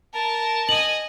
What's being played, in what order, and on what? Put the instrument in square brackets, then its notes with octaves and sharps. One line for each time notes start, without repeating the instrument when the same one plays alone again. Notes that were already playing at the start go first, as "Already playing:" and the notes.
[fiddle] A#4 [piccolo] A5
[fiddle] D#5 G#5 [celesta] F#7